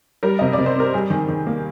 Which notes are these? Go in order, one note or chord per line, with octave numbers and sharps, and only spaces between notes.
G3 A#4
C3 D#5
D5
C3
C5
C4 A#4
G3 G#4
D#3
D#3
A#3